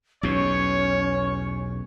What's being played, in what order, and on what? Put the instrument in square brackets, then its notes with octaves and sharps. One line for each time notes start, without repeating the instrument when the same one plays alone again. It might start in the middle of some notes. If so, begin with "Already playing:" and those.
[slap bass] B1 E2 B2 [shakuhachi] C#4 [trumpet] C#5